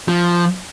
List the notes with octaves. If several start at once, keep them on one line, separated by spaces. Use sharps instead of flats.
F3